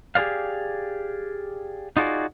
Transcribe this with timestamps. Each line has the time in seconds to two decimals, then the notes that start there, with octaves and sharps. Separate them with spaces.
0.15 G4 G#4 C5 D5 F5
1.97 D#4 F4 F#4 G#4 D5